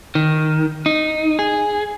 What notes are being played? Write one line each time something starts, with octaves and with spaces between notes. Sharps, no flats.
D#3
D#4
G#4